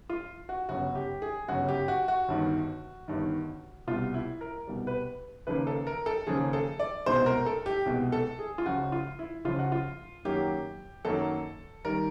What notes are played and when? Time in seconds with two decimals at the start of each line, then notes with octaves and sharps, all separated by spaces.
0.10 F4
0.49 F#4
0.69 G1 F#2 C#3 F#4
0.95 G4
1.22 G#4
1.48 G1 F#2 C#3 F#4
1.69 G4
1.88 F#4
2.08 F#4
2.28 G1 G2 D#3
3.08 G1 G2 D#3
3.87 C2 B2 G3 F4
4.14 E4
4.41 A#4
4.67 C2 B2 G3
4.87 B4
5.47 D#2 C#3 F3 A#3 B4
5.67 A4
5.87 A#4
6.06 A4
6.27 D#2 C#3 F3 A#3 G#4
6.53 A4
6.79 D5
7.06 C2 B2 G#3 C5
7.26 A#4
7.46 A4
7.66 G4
7.86 C2 B2 G#3
8.12 A4
8.39 G#4
8.58 F4
8.66 C#2 C#3 F3 F#4
8.92 F4
9.19 E4
9.45 C#2 C#3 F3 F4
9.59 F#4
9.72 F4
10.25 F#2 D#3 F#3 A#3 G4
11.05 F#2 D#3 F#3 A#3 A4
11.85 D#3 G3 A#4